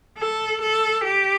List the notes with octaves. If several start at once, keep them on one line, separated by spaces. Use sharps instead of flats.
A4
A4
G4